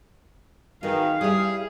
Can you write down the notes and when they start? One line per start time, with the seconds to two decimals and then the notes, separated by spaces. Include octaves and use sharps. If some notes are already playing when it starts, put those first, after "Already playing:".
0.83 D#3 F#4 G#4 B4 F5
1.21 G3 E4 G#4